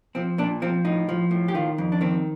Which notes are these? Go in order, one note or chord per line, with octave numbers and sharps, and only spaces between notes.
F3 C4
A#2 D4
F3 C4
A2 D#4
F3
A2
G4
D#3 F4
F2
D4
D#3 C4